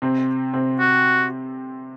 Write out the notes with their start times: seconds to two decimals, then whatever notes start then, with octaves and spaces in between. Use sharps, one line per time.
0.02 C3 C4
0.53 C3 C4
0.80 F#4